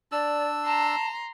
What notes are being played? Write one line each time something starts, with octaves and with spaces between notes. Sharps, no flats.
D4 D5 E6
A5 A#5 C6